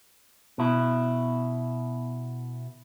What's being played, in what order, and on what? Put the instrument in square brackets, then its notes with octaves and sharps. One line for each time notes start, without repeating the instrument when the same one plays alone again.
[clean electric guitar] B2 E4